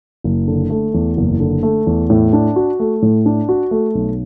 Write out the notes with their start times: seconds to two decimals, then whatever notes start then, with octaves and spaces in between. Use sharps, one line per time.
0.24 F#1
0.48 D3
0.70 A3
0.94 E2
1.17 F#1
1.40 D3
1.63 A3
1.87 E2
2.10 A2
2.33 D4
2.56 F#4
2.80 A3
3.02 A2
3.26 D4
3.49 F#4
3.71 A3
3.95 B1